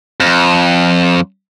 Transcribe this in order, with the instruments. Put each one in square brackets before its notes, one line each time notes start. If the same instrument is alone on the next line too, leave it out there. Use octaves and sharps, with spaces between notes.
[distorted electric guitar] F2